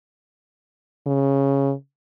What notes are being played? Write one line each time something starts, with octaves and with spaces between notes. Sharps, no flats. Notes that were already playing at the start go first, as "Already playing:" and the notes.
C#3